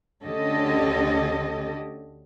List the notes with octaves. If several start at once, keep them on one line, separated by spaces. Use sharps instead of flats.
D2 D3 C#4 G4 A4 D#5